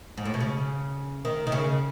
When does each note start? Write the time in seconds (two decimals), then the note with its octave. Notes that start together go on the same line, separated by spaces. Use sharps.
0.17 G#2
0.25 A2
0.34 B2
0.40 C#3
1.25 D#3
1.47 D#3
1.52 C#3